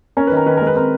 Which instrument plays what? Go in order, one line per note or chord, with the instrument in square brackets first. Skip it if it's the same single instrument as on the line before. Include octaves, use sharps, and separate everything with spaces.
[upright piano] C#4 A#4
D#3 B4
A#4
D#3 B4
G#3 A#4
B4
C4 A#4